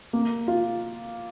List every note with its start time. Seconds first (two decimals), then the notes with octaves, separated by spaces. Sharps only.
0.13 A#3
0.48 F4